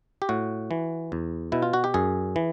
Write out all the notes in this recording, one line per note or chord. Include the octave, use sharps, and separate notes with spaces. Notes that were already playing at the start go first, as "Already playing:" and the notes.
G4
A2 F#4
E3
E2
B2 E4
F4
F#4
G4
F#2 G#4
E3